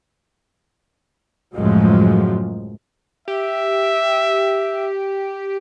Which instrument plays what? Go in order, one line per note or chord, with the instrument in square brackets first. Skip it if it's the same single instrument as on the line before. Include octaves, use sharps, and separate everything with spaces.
[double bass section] C#2 F#2 A2 F3 F#3 G#3
[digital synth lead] G4 [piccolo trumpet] E5